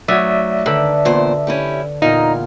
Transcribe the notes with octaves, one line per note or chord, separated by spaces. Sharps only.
F#3 A3 D#4 C#5 D5 E5
D3 D#3 A4 B4
E2 A#2 C5
C#4 E4 G4
E2 A#2 D#4 F5